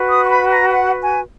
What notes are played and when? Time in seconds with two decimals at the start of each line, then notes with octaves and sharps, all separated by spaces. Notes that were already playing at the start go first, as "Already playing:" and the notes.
Already playing: F#4 B4
0.09 D#6
0.23 C#6
0.29 B5
0.51 A#5
0.71 F#5
1.00 G#5